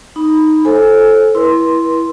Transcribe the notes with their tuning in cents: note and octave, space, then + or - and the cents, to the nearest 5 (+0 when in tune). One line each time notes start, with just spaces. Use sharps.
D#4 +0 B5 +0
A4 -10 C5 +30 G#5 +0
E4 +0 B4 -45 C6 +0